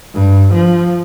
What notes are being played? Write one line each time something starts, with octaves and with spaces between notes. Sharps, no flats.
G2
F3